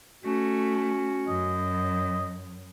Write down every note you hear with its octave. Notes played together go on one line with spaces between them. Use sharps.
A3 C#4 F#4
F#2 D#5